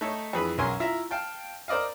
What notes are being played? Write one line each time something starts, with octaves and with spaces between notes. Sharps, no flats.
A3 D#4 A4 C#5
F2 E3 G#4 B4 B5
B1 F#2 C#4 A#4 G#5 C6
E4 F4 E5 A#5
F5 G5 A5
A#4 C5 D5 D#5 F5